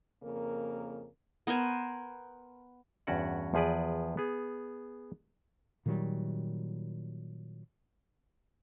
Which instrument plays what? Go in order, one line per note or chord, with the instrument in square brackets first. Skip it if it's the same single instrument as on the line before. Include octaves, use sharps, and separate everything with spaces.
[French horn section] F2 C#3 A#3 A#4
[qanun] B3 A#4 C5 G#5
[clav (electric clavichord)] E2 G2 C#4 F#4 D5 F#5
E2 F3 G#4 B4 D5
B3 G#4
[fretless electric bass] A#2 D#3 F#3 G3